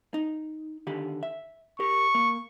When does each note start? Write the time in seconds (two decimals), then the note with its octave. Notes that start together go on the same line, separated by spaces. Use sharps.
0.14 D#4
0.87 D3 D#3 G4
1.23 E5
1.80 G4 A#4 C#6
2.15 A#3